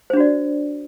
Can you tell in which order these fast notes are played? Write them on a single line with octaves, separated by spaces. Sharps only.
C5 D4 F#4 D5